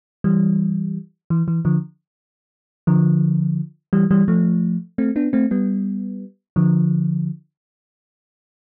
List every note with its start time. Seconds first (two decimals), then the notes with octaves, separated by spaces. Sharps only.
0.24 E3 G3
1.30 E3
1.48 E3
1.65 D3 F3
2.87 D3 F3
3.93 E3 G3
4.11 E3 G3
4.28 F3 A3
4.98 A3 C4
5.16 B3 D4
5.33 A3 C4
5.51 G3 B3
6.56 D3 F3